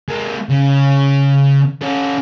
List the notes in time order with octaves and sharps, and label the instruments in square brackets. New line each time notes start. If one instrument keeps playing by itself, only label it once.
[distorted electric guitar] G#3 A#3
C#3
C#4 A4